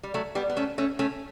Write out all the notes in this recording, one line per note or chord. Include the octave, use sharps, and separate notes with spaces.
G3
F#3 A3
G3 B3
B3
A3 C#4
A3 C#4
A3 C#4